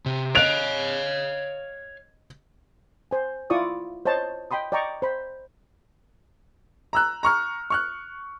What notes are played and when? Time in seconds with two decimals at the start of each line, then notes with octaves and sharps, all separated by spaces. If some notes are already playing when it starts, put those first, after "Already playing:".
0.06 C3
0.35 C#5 D#5 F5 F#6 A6 D7 F7
3.11 C5 G#5
3.50 E4 F4 D5 C#6 D#6
4.06 C5 C#5 D#5 A5
4.51 D#5 G5 B5 C6 D#6
4.72 D5 D#5 G5 A#5 C#6
5.02 C5 B5
6.93 A#5 E6 F#6
7.23 A#5 C#6 F6
7.70 C#6 F6 F#6